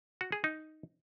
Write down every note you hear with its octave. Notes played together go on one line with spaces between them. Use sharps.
F#4
G#4
D#4